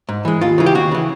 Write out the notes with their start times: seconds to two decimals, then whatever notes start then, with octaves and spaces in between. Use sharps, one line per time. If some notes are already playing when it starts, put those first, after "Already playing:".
0.09 G#2
0.25 E3 G#3
0.41 D#2 F4
0.58 C#3 E3
0.66 G4
0.75 D#2 F#4
0.91 C#3 E3